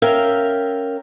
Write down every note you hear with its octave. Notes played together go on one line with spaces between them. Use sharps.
C#4 A#4 E5 F5 G5